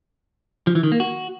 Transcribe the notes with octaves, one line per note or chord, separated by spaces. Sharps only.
F3
E3
D#3
A#3
F#4